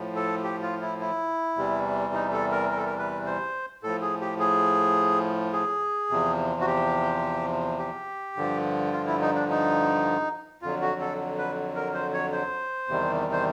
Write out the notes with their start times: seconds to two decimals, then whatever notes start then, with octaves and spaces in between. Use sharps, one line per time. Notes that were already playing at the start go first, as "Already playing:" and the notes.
Already playing: A2 F3
0.16 A4
0.43 G4
0.62 F4
0.81 E4
1.00 E4
1.56 E2 C3 E3 G3
2.14 D#4
2.32 A4
2.52 A#4
2.70 A#4
2.77 A4
2.85 A#4
2.99 B4
3.26 C5
3.83 A2 F3 A4
4.01 G#4
4.21 G4
4.39 G#4
5.53 G#4
6.10 E2 C3 F3
6.61 F#4
6.67 G4
7.79 G4
8.36 G2 D3 F3
8.92 F4
9.06 E4
9.21 D#4
9.35 D4
9.49 D#4
10.62 F2 D3 F#3 F4
10.82 F#4
11.00 A4
11.38 B4
11.75 A#4
11.94 C5
12.13 C#5
12.32 C5
12.88 E2 C3 D#3 G3
13.33 C5